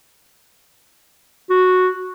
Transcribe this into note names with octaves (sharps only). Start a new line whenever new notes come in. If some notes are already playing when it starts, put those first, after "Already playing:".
F#4